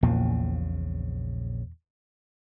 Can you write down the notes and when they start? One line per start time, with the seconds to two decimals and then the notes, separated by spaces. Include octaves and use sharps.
0.03 A#1 E2 A#2 C#3 A#3